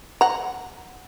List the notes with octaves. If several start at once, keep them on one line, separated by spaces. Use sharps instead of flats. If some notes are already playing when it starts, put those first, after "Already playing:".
F#5 A#5